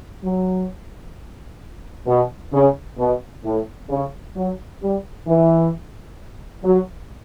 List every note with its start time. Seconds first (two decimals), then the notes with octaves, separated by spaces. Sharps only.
0.23 F#3
2.07 B2
2.52 C#3
2.98 B2
3.44 A2
3.89 C#3
4.35 F#3
4.81 G3
5.27 E3
6.63 F#3